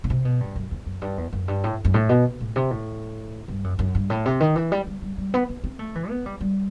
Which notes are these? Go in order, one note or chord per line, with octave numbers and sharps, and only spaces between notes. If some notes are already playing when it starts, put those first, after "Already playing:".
B2
C3
B2
G2
F#2
E2
F#2
G2
E2
F#2
G2
A2
F#2
A2
B2
A2
C3
A2
G2
F#2
F#2
G2
A2
C3
D#3
E3
G3
G3
G3
G3
B3
B3
C4
A3
E3
B3
G3
G3